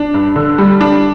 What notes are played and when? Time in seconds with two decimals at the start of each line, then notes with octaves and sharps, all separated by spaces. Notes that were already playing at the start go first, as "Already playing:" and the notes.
Already playing: D4
0.14 G2
0.36 D3
0.58 G3
0.81 D4